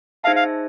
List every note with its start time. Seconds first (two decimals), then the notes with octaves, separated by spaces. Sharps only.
0.24 D#4 G#4 C5 E5 F5 A5
0.36 F5